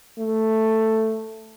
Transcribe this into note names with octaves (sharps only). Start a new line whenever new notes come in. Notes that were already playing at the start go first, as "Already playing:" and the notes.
A3